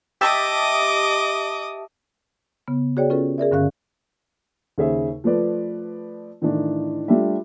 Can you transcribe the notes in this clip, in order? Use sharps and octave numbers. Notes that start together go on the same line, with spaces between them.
G4 D#5 E5 A5 D6 D#6
C#3 B3
F#4 G#4 C#5 D5 G5
C#4 F4 A4 B4
G#4 A#4 D5 E5
G2 D3 C#4 F5 F#6
D#2 C#3 G#4 C5 E5
F3 A3 F4 B4 D5
A2 D#3 E3 D4 E4
G3 A3 D4 F4 G4 E5